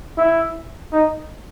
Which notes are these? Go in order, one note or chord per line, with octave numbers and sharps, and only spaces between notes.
E4
D#4